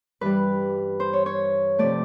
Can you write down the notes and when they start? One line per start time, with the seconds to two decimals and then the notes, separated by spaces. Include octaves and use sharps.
0.21 G2 E3 G3 B4
1.00 C5
1.13 C#5
1.26 C#5
1.79 C3 F3 A3 D5